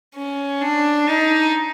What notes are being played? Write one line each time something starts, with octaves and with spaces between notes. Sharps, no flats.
C#4
D4
D#4